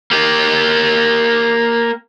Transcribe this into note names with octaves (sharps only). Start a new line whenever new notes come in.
A#3 G4